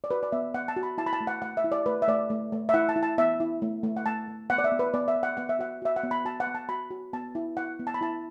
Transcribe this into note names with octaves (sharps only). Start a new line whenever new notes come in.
D5
F#4 B4
D5
B3 E5
B3 F#5
A5
F#4
B5
E4 A5
B5
A5
A3
F#5
A3 F#5
E5
E4
D5
A3 B4
E5
A3 D5
A3
A3
E5
E4 F#5
A5
E4
A5
B3 E5
E4
A3
A3
F#5
A3 A5
A3
B3 F#5
D5
E5
B3
B4
B3 D5
E5
B3
F#5
B3 F#5
E5
F#4 F#5
F#4 E5
F#5
B3
B5
F#4 A5
F#5
B3
A5
F#4 B5
F#4
B3 A5
E4
E4 F#5
B3
A5
B5
E4 A5